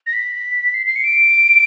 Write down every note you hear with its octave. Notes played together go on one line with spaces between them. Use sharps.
A#6
B6
C7
C7
C#7
D7